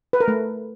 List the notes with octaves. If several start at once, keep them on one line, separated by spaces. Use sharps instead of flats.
B4
A#4
A3